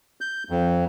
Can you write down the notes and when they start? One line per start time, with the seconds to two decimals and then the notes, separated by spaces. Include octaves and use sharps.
0.21 G6
0.50 F2